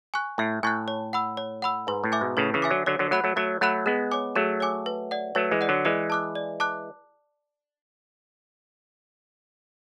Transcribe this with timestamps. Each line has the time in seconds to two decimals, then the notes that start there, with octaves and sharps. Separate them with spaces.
0.14 G#5 C#6 F#6
0.38 A2 E5
0.63 A2 G#5 C#6 F#6
0.88 C#5
1.13 F#5 B5 E6
1.37 C#5
1.62 F#5 B5 E6
1.87 G#2 B4
2.04 A2
2.12 E5 G#5 D6
2.21 G#2 B2
2.37 A2 C#3 B4
2.54 C#3 E3
2.62 E5 G#5 D6
2.71 D3 F#3
2.86 D3 F#3 C#5
2.99 D3 F#3
3.11 F#3 A3 F#5 B5 F#6
3.24 F#3 A3
3.36 F#3 A3 C#5
3.61 F#3 A3 F#5 B5 F#6
3.86 G#3 B3 G#4
4.11 C#5 G#5 D6
4.35 F#3 A3 G#4
4.60 C#5 G#5 D6
4.86 B4
5.11 D5 F#5
5.35 F#3 A3 B4
5.51 E3 G#3
5.61 D5 F#5
5.69 D3 F#3
5.85 E3 G#3 D5
6.10 A5 D6 F#6
6.35 D5
6.60 A5 D6 F#6